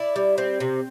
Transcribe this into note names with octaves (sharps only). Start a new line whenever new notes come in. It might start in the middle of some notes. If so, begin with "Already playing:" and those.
Already playing: E4 D5
G3
C4
C3